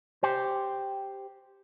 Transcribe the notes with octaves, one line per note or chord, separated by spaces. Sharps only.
G4 C5